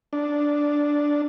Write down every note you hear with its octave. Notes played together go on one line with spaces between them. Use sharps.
D4